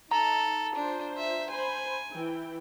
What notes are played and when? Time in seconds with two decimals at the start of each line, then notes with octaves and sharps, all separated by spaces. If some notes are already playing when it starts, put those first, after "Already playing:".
0.11 D#4 A4 A#5
0.75 D4 F4 C5
1.18 E5
1.50 C5 G#5 B5
2.15 E3 E4 G5